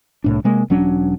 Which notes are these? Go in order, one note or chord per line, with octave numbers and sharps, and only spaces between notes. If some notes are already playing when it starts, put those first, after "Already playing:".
C2 A2 D4
C3 G#3 A#3
E1 F#3 C#4 D4